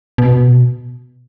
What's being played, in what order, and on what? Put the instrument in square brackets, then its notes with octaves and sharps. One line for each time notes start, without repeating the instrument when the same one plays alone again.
[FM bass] B2